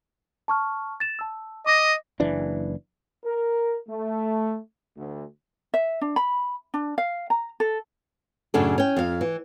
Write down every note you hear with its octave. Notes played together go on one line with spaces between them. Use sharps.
A5 C#6 F6
A6 E7
A5 E6
D#5 D6 A#6
F#1 E3 D4
A#4
A3
D2
E5
D4
B5
D4
F5
A#5
A4
F#2 A2 C#3 D4 A4
C#4 G5
F2 F5
E3